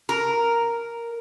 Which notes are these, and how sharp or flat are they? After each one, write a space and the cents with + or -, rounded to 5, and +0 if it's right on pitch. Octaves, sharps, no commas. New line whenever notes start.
A#4 +0